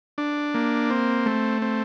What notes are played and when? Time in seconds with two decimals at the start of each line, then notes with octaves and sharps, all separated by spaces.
0.18 D4
0.54 A#3
0.90 C4
1.26 A3
1.62 C4